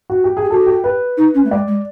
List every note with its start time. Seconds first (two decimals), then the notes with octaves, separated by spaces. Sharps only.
0.10 F#4
0.24 G4
0.37 G#4
0.45 G4
0.50 F#4 A4
0.66 G4
0.84 B4
1.17 D#4
1.34 C#4
1.44 A3
1.51 G#3 D5
1.67 G#3